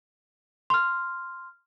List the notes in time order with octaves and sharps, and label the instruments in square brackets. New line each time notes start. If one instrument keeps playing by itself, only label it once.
[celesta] C6 F6